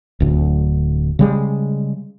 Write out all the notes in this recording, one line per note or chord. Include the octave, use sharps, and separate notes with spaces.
D1 D2
C#3 G3 G#3